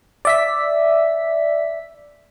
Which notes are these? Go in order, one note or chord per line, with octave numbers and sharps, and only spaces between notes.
D5 E5 B6